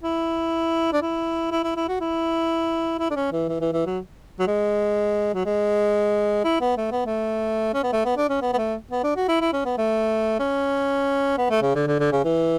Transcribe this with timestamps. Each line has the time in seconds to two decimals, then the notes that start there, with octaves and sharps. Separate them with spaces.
0.03 E4
0.93 D4
1.02 E4
1.52 E4
1.64 E4
1.76 E4
1.88 F#4
2.01 E4
2.99 E4
3.11 D4
3.16 C#4
3.32 E3
3.49 E3
3.61 E3
3.73 E3
3.86 F#3
4.39 F#3
4.47 G#3
5.34 F#3
5.46 G#3
6.44 E4
6.61 B3
6.77 A3
6.92 B3
7.06 A3
7.74 C#4
7.83 B3
7.93 A3
8.05 B3
8.17 D4
8.29 C#4
8.42 B3
8.53 B3
8.58 A3
8.91 B3
9.04 D4
9.16 F#4
9.28 E4
9.41 E4
9.53 C#4
9.65 B3
9.78 A3
10.39 C#4
11.38 B3
11.50 A3
11.62 C#3
11.75 D3
11.87 D3
12.00 D3
12.12 C#3
12.24 E3